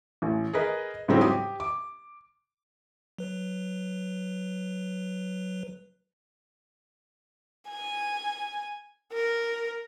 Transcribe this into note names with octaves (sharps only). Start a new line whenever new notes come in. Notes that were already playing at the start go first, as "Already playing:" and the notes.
A1
G#4 A#4 B4 D#5
G#2 C#3 E3 F#3 G3 C4
G4 D#6
D6
F#3 B4
G#5
A#4